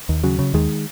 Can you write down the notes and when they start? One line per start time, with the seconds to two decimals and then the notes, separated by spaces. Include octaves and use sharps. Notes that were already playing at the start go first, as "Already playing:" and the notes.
0.09 D#2
0.24 C#3 F#3
0.39 C#3
0.54 D#2 D#3 G#3